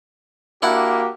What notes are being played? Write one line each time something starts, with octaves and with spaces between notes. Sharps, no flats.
A#3 D4 E4 F#4 G4 F#5